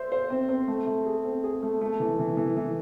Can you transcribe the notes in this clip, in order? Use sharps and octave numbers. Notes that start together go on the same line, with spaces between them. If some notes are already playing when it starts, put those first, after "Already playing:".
Already playing: C5 E5
C5
C4
C4
A3
A3
G#4
C4
G#4
A3
A3
E3
E3
E3
E3